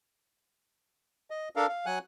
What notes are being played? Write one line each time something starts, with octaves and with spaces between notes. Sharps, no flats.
D#5
D4 A4 A#4 F5
F5
F#3 F#5 G#5 F#6